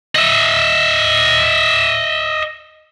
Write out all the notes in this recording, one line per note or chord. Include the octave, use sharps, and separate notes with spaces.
D#5 E5